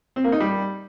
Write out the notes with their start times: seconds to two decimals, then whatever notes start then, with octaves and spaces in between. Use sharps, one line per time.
0.16 C4
0.24 A#3
0.32 D#4
0.40 G3